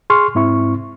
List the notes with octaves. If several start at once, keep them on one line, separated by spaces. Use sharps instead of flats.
G#4 C6 C#6 F6
G#2 C4 E4 C#6